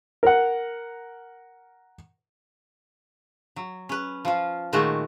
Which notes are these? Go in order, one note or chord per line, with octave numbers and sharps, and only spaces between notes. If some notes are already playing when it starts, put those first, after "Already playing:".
A#4 F#5
F#3
C#4 B4
F3 F4
A#2 D#3 G#3 A3 F#4 A5